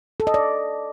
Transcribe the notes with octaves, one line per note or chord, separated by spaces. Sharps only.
A4
D#5
D5